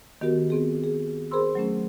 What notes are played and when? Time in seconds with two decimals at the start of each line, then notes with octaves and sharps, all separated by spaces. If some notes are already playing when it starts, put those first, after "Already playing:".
0.21 D#3 B3 F#4 G4 A#4
0.50 B3 C4 G#4
0.84 G#4
1.31 G#4 A#4 C5 B5 C6 E6
1.55 F#3 A3 C#4